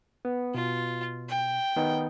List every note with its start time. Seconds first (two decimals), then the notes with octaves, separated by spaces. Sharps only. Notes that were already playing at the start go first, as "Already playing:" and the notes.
0.25 B3
0.54 B2 F4
1.29 G5
1.76 D#3 B3 D#4